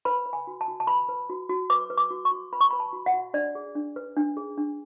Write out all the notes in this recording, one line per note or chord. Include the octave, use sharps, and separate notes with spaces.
B4 B5
B4
G#5
F#4
A5
F#4
A5
B4 B5
B4
F#4
F#4
B4 D6
B4
D6
F#4
C#6
F#4
B4 B5
C#6
B4 B5
A5
F#4
F#5
F#4
D4 D5
G#4
D4
B4
D4
G#4
D4